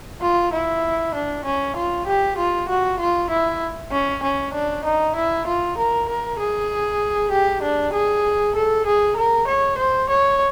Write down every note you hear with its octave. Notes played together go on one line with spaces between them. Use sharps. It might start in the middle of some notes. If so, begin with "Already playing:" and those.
F4
E4
D4
C#4
F4
G4
F4
F#4
F4
E4
C#4
C#4
D4
D#4
E4
F4
A#4
A#4
G#4
G4
D4
G#4
A4
G#4
A#4
C#5
C5
C#5